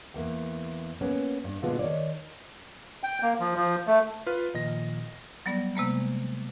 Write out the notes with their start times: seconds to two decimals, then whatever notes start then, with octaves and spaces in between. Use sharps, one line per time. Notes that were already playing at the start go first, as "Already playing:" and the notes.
0.14 E2 A#3 G5
1.01 A#3 B3 C#4
1.44 G2
1.62 A#2 D3 G#3 B3 F4
1.79 D#3 C#5 D5
3.03 G5
3.22 A#3
3.40 F3
3.56 F3
3.87 A3
4.26 F4 B4 F6
4.54 A#2 D#3 F3 D#5 A#6
5.46 F#3 G3 B3 D5 A#6
5.75 C3 G#3 A#3 B3